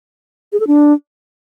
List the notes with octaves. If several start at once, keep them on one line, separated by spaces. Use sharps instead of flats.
G#4
A4
D4